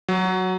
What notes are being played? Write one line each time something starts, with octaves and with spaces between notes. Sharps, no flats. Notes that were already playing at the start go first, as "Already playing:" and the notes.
F#3